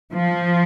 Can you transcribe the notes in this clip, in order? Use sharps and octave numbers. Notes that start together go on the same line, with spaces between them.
F3